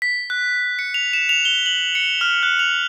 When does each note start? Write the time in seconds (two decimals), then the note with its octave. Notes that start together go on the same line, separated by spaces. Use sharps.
0.02 B6
0.30 F#6
0.79 C#7
0.94 F7
1.13 E7
1.29 F7
1.45 G7
1.66 F#7
1.95 C#7
2.21 F6
2.43 F#6
2.59 F7